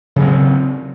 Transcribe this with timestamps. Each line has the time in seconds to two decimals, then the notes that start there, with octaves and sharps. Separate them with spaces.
0.16 C#3
0.20 F#3
0.23 C4